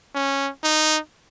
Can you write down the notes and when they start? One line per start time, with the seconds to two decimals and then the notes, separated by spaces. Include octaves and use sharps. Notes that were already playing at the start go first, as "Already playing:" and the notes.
0.15 C#4
0.63 D#4